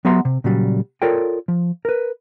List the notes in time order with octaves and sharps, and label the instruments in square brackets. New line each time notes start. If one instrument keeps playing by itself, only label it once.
[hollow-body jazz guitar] F#3 B3 G4 E5 A#5 C6
C3
A#2 C#3 F#3 G3
F4 A4 A#4 C#5 D5 G5
F3
A#4 B4